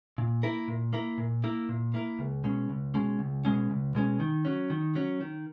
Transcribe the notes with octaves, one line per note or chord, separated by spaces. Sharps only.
A#2
A#3 E4 A#4
A#2
A#3 E4 A#4
A#2
A#3 E4 A#4
A#2
A#3 E4 A#4
C#2
B2 G#3 C#4
C#2
B2 G#3 C#4
C#2
B2 G#3 C#4
C#2
B2 G#3 C#4
D#3
F#3 C#4
D#3
F#3 C#4
D#3